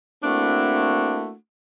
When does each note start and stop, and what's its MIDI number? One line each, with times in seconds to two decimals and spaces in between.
0.24 1.34 57
0.24 1.34 58
0.24 1.34 60
0.24 1.34 62
0.24 1.34 64
0.24 1.34 66